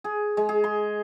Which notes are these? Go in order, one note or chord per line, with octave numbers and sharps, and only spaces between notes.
G#4
G#3
G#4
C6